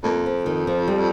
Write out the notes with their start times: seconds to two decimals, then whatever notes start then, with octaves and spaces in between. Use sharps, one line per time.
0.04 F2 A#3
0.26 F3
0.46 D#3
0.67 F3
0.88 G3